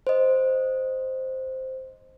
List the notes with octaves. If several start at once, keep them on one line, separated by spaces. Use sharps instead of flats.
C5 D#5